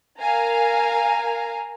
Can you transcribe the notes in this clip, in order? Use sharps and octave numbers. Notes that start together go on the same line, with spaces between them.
A#4 F5 G#5 A#5